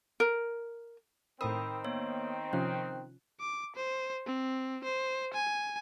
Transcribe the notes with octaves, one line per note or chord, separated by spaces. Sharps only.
A#4
A2 D#3 C4 A#4 B5 D#6 E6
A#3 B3 C#5
C3 F3 C#4 F#6
D6
C5
C4
C5
G#5